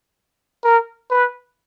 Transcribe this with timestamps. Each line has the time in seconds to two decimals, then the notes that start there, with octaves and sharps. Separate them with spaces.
0.64 A#4
1.10 B4